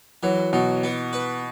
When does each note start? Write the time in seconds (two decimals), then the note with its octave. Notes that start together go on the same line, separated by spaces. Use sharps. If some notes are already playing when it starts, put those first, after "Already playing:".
0.23 E3 F#3
0.53 B2 F#3
0.83 B3
1.13 B4